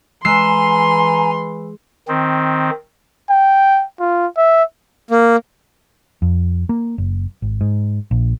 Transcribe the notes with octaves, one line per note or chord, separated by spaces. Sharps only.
E3 G#3 G#5 A#5 C6 E6 C7
D#3 C4
G5
F4
E5
A#3
F2
A#3
F#1
G#1
G#2
A#1